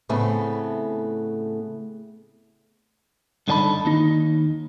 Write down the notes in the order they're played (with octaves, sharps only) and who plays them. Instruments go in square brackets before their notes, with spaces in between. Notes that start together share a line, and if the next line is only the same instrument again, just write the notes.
[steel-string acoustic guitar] A2 C#3 A3 B3 C4
[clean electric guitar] G2 D3 B3 D#4 A5 B5
D#2 D#4